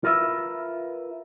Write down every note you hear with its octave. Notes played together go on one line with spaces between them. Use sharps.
F4 A#4 B4 E5